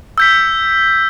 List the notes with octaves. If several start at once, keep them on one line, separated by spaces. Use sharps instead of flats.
E6 G6 B6